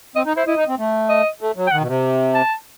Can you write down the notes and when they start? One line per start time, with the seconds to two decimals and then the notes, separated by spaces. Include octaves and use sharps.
0.16 C4 D#5
0.26 D#4
0.36 E4 C5
0.47 E4 D#5
0.57 D#4
0.68 C4
0.78 A3
1.09 D#5
1.41 A3
1.57 F#3
1.67 G5
1.72 D#3 F#5
1.81 B2
1.87 C3
2.34 A5